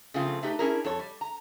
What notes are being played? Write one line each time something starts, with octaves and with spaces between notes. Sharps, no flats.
C#3 F3 A3 C4 F4
A3 D#4 G4 B4
C#4 D4 E4 G#4 A#4
F2 A4 C#5
G3
A#5